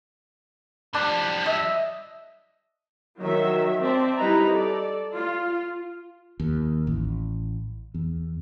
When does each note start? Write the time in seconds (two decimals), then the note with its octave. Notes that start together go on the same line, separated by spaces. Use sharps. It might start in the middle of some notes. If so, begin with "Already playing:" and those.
0.94 F3 G3 D4
1.46 D#5 E5
3.21 D#3 F#3 E5
3.80 C4 D5 E5 A5
4.18 G3 D#4 E4 B4 A#5
4.51 A4 D5
5.14 F4
6.40 D#2
6.87 A1
7.94 E2